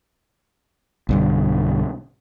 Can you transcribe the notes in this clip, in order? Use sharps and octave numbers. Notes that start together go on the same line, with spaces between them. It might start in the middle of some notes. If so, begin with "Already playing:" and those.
B1 G2 D3